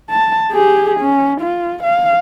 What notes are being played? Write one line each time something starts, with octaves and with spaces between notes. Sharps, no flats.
A5
G4 G#4
C#4
F4
F5